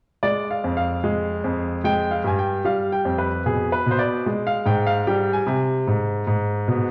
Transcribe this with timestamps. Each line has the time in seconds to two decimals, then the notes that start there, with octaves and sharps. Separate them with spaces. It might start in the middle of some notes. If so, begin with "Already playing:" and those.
0.23 G#3 D5
0.51 F5
0.64 F2
0.77 F5
1.04 G#3
1.44 F2
1.84 G#3 G5
2.11 F5
2.24 G2 G#5
2.39 G5
2.65 G3 F5
2.92 G5
3.05 F2
3.18 B4
3.45 B2 G#4
3.72 B4
3.86 B2 C5
3.99 D5
4.26 G#3
4.47 F5
4.66 G#2 G5
4.87 F5
5.07 G3 G5
5.33 G#5
5.47 C3
5.87 G#2
6.27 G#2
6.68 B2